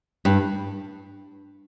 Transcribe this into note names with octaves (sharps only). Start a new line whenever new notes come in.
G2